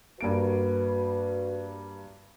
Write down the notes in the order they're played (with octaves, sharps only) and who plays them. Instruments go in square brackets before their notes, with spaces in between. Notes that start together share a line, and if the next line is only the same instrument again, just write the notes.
[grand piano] G2 A#3 D7 [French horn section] F#4 B4